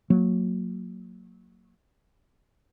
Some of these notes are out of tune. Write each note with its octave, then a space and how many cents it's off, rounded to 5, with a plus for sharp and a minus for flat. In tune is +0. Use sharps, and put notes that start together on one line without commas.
F#3 -15 A#3 -25